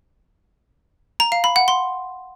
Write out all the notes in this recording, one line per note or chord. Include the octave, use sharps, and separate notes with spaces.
A#5
F5
B5
F#5
C6